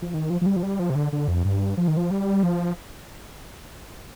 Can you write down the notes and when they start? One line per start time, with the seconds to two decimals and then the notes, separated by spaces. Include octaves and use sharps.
0.02 F3
0.14 D#3
0.30 F3
0.41 F3
0.46 G3
0.56 F3
0.63 G3
0.79 F3
0.90 C3
0.95 D3
1.13 D3
1.28 F2
1.45 G2
1.77 F3
1.88 D#3
1.97 F3
2.11 G3
2.43 F3